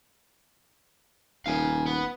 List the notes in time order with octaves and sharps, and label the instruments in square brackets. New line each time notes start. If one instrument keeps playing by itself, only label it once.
[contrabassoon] D#1 [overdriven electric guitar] F5 G#5
[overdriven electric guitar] B3